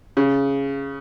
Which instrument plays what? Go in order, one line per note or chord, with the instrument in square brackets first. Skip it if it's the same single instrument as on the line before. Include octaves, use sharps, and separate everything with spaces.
[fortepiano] C#3